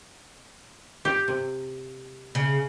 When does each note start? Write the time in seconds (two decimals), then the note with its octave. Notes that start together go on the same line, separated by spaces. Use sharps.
1.05 G4
1.28 C3
2.35 C#3